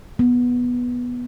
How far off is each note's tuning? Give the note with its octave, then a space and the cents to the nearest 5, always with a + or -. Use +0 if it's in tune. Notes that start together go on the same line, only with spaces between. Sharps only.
B3 -10